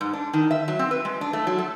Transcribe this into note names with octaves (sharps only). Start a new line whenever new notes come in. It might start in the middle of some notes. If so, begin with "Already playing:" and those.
G#2
D4
D#3
E5
F#3
C4
B4
G#3
D4
A3
F#3
A4